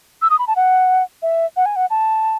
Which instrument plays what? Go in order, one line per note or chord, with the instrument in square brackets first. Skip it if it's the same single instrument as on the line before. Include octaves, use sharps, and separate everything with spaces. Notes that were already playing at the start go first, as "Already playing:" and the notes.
[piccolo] E6
D#6
B5
A5
F#5
E5
F#5
G#5
F#5
A5